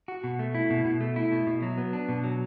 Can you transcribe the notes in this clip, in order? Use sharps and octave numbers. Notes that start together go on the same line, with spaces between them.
F#4
B2
A3
E4
B2
B2
A3
E4
B2
B2
F#3
B3
D4
B2
F#3